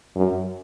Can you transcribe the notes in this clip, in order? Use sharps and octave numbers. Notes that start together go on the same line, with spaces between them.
F#2